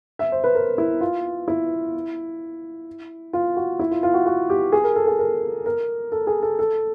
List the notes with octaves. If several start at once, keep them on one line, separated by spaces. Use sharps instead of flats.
E5
C5
B4
A#4
E4
F4
E4
F4
F#4
E4
F4
F4
F#4
F#4
G4
G#4
A#4
A4
G#4
A#4
A#4
A4
G#4
A4
A4